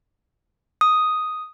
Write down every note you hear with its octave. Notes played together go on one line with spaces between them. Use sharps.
D#6